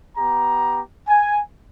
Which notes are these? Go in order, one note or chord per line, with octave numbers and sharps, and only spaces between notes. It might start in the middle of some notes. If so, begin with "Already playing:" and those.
B3 G4 A#5
G#5